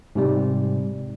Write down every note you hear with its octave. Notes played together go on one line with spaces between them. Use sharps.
G#2 C3 G3